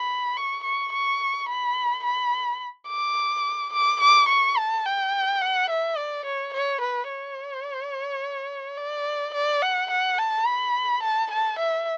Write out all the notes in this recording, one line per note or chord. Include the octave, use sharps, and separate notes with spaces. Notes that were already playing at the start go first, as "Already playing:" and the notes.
Already playing: B5
C#6
C#6
C#6
B5
B5
D6
D6
D6
C#6
A5
G5
F#5
E5
D5
C#5
C#5
B4
C#5
D5
D5
F#5
F#5
A5
B5
A5
A5
E5